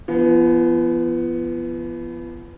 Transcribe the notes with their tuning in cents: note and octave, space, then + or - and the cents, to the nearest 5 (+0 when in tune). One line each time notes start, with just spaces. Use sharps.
F3 -40 B3 +0